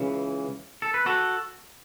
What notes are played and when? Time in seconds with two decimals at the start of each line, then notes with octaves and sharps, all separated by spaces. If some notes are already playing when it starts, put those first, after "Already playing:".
Already playing: C#2 C#3 E3
0.82 A4
0.94 B4
1.06 F#4 A4